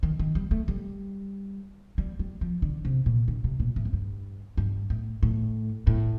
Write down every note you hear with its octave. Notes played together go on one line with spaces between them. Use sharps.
D#3
D#3
G3
A3
G3
G3
G3
F3
D3
C3
A#2
D3
C3
A#2
A2
F2
G2
G2
A2
A2
A2